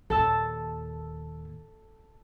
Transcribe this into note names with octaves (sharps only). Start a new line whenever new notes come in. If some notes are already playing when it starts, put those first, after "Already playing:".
D#2 A#2 A4 A5 E6